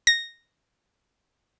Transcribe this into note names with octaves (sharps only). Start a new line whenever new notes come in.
A#6